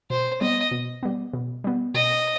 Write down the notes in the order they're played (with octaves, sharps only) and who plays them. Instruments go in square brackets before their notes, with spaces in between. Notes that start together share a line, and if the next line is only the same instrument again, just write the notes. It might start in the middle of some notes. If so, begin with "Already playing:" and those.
[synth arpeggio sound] B2 [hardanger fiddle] C5
[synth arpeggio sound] G3 B3 [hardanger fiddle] D#5
[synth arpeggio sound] B2
G3 B3
B2
G3 B3
[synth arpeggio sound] B2 [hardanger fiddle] D#5